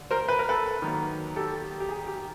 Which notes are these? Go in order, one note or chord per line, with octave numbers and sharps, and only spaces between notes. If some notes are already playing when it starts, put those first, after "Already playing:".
Already playing: D3
A#4 C5
B4
A#4
A4 B4
D#3 F#3 A#3
G4 A4
G4
G#4
G4